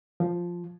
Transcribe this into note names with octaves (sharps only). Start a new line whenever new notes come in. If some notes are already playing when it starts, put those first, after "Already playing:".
F3